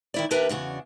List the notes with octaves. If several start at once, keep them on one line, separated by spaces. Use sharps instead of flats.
D#3 E4 D5
D#2 D4 G4 A#4 B4 E5
E2 C#3 D4 F#4